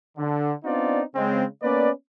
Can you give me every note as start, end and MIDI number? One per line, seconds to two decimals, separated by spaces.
0.18 0.52 50
0.64 1.01 59
0.64 1.01 60
0.64 1.01 62
0.64 1.01 63
0.64 1.01 65
0.64 1.01 74
1.15 1.44 49
1.15 1.44 56
1.15 1.44 60
1.62 1.90 58
1.62 1.90 59
1.62 1.90 61
1.62 1.90 71
1.62 1.90 74